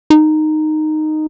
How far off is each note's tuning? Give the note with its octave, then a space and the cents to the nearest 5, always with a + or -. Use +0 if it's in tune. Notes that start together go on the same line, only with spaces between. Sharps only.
D#4 -10